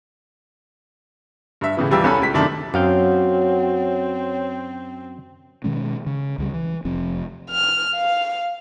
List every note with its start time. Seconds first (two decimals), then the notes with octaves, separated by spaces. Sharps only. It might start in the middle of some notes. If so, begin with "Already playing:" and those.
1.61 G2 E5
1.77 A2 C#3 E3
1.91 D#1 E3 G3 F5 G5 E6
2.04 C2 C#4 A4 B5
2.22 C#2 B6
2.34 F#2 C3 D#3 A3 D4
2.74 F#2 C4 F#4 C#5 F5 G5
5.64 B2 D#3 G#3 C#4
6.06 C#3
6.38 C#2 C#3 G3
6.54 E3
6.85 F1 F3 C4
7.50 F6
7.96 F5